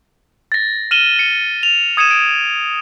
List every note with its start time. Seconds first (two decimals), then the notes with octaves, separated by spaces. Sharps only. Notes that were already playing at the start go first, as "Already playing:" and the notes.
0.52 A6 A#6
0.91 F6 D#7 E7 F#7 G7
1.19 C#7
1.63 F7
1.97 D#6 G#6 C#7 D#7 E7
2.11 D7